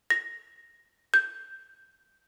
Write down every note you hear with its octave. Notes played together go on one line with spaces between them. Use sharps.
A#6
G6